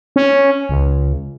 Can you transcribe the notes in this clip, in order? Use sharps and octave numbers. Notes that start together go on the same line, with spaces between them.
C#4
C#2